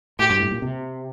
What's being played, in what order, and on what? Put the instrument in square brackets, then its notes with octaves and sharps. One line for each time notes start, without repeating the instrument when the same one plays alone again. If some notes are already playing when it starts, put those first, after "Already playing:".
[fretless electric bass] A2 [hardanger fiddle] G4
[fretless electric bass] G2
A2
A#2
C3